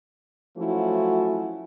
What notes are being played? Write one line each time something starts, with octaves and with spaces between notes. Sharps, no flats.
F3 F#3 A3 C#4 E4 F#4